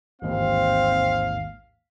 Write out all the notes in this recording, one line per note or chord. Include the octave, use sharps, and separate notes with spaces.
A1 D#2 G#2 C4 F5